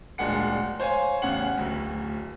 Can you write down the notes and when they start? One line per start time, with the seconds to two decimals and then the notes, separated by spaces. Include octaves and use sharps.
0.18 D1 A#2 G#3 D4 F#5 C#7
0.80 C5 C#5 F5 G#5
1.22 A1 E2 C#3 F#5 F#7
1.58 D1 D2